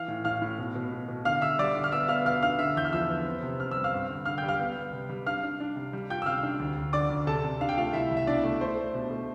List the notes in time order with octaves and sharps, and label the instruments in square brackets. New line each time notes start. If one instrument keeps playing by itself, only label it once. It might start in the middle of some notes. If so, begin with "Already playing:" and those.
Already playing: [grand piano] E3 F5 F6
A2
A2 F5 F6
A2
B2
B2
B2
B2
D3 F5 F6
D3 E5 E6
G3 D5 D6
D3
F6
B3 E5 E6
B3 F5 F6
B2 F5 F6
D4 F5 F6
D3 E5 E6
E2 G6
F6
F3 E5 E6
B3
C4
C3
C4 F6
E6
G3
F5 F6
G2
D3
D3 F5 F6
G5 G6
G3
F5 F6
B3
B3
C3
G3
D4 F5 F6
D4
D4
C3
G3
F4 G5 G6
E6
C3 F5 F6
D4
D2
D2
D3 D5 D6
D2
C3 A4 A5
C3
D4 F5
G5
A3 F4 F5
C2 E4 E5
C2
E5
B2 D4 D5
A3
A3 C5
A3
B2
A3